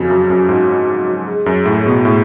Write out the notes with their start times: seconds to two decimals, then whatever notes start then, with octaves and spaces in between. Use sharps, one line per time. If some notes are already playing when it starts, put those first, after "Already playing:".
Already playing: F2 C#3 F#4
0.10 F#2
0.30 F#2
0.49 G#2
1.28 G#4
1.46 F#2
1.66 A2
1.86 B2
2.05 A2